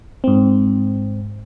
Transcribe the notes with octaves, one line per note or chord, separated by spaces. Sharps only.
G#2 C4